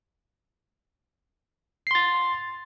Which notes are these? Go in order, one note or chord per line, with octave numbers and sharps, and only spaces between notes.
C6 A6 C7